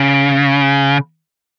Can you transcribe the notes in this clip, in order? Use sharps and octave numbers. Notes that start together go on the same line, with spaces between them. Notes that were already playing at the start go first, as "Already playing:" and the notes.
Already playing: C#3